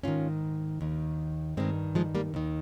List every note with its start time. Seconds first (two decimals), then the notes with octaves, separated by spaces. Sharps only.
0.03 G#2 D#3 C#4 F4
0.81 D#2 D#3
1.57 G2 D#3 G#3 C4
1.95 F3 G#3
2.15 G3 A#3
2.34 D#2 D#3